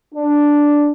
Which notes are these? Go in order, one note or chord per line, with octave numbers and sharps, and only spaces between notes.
D4